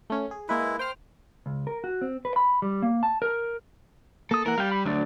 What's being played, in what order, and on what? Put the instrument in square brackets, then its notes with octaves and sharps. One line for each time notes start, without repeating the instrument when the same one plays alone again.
[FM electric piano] A3 C#4
G#4
[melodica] G#3 E4 [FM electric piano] A#3 B4
[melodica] C5 [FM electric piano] G5 F6
[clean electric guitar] C#2
A#4
F#4
C4
B4
B5
G3
A#3
A5
A#4
[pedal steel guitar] A#3 D#6 [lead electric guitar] A4
[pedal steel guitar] E3 A#3 F#5 [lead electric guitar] A#4
[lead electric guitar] G3 [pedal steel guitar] F5 G5
[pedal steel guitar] B5
[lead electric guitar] D2 [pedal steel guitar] F#3 D4 D5